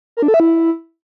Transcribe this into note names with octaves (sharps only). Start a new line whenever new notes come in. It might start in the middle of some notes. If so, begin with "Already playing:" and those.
A#4
D4
A4
E5
E4